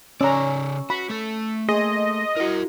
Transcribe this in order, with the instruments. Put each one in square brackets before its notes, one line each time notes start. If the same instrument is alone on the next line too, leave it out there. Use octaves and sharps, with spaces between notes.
[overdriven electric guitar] C#3 D5 [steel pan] C#4 A#5 [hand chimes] C#6 E6
[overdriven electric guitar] F#4 [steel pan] B5
[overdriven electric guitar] A3 A4
[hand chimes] A#3 C6 [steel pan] G#4 [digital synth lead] D#5
[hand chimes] E4 F#4 [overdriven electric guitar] A#4 F#5